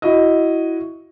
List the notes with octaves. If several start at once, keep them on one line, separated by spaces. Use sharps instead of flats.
E4 F#4 D#5